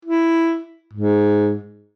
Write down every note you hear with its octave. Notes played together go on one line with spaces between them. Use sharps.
E4
G#2